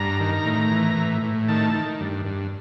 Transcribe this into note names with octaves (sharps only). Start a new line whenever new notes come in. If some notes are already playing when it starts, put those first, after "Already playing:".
Already playing: G2 A#5
D#3
A2
E3
A2
A2
D#3 A5
D#3
G2
G2